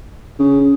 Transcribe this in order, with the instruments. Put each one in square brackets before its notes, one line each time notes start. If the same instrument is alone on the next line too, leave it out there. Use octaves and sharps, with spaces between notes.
[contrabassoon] C#3